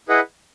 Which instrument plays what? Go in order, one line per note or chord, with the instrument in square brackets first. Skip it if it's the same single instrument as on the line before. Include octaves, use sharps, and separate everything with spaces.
[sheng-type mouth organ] E4 G#4 B4 D#5 F#5